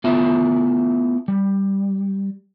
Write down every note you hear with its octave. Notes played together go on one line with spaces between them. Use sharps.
A3 B3 E4 F4 E5
G3